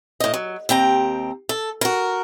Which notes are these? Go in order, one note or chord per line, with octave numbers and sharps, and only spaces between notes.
A2 D#5
F#3
D#2 C4 G5 A#5
A4
F#4 A#4